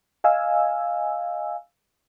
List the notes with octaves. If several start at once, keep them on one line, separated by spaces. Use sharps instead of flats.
D#5 F5 G#5 E6